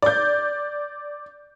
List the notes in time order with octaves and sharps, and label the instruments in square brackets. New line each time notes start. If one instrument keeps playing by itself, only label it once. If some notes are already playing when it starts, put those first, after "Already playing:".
[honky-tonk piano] D5 G6